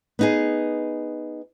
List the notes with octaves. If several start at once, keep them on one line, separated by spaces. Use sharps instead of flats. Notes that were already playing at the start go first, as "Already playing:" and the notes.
B3 D#4 G#4